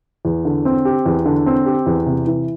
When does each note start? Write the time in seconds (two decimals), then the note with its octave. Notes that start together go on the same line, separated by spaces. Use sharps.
0.25 E2
0.45 D3
0.65 C4
0.85 G4
1.06 E2
1.26 D3
1.46 C4
1.66 G4
1.86 E2
2.06 C3
2.27 E3